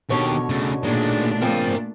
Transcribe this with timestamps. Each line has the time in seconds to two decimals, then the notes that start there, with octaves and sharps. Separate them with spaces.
0.10 B2 D3 D#3 G4 C#5
0.49 C#3 A3
0.83 A#2 D#3 G#3 A3 D4
1.42 C#3 F3 C4 A#4 G#5